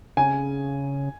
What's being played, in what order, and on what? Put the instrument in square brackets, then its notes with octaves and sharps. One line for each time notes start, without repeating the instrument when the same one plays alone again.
[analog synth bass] C#3 [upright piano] G#5